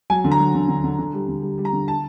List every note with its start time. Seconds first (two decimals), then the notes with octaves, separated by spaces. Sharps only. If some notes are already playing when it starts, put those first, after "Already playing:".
0.10 F#3 G#5
0.24 D3
0.32 A#5
0.39 F#3
0.55 D3
0.68 D3
0.84 D3
0.99 D3
1.13 G3
1.28 D3
1.42 G3
1.58 G3
1.65 A#5
1.73 D3
1.88 A5